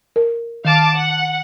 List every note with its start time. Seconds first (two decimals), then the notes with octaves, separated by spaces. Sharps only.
0.16 A#4
0.65 D#3 F5 A5 D6
0.94 F#5